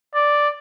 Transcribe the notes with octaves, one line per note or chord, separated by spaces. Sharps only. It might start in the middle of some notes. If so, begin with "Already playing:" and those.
D5